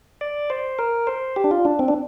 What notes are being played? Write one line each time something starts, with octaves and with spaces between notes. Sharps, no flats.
D5
C5
A#4
C5
G4
D4
F4
D4
C4
D4